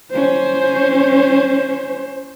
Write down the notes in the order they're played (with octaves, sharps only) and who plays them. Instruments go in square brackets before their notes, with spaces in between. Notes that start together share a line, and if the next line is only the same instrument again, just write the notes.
[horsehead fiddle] C#4 C5